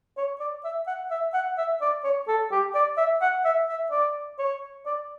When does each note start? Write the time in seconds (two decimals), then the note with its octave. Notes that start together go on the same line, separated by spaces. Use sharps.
0.18 C#5
0.40 D5
0.65 E5
0.87 F#5
1.11 E5
1.34 F#5
1.58 E5
1.81 D5
2.04 C#5
2.28 A4
2.52 G4
2.75 D5
2.98 E5
3.22 F#5
3.45 E5
3.69 E5
3.91 D5
4.39 C#5
4.86 D5